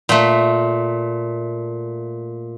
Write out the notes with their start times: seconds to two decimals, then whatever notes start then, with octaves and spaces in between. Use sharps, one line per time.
0.09 A#2 A3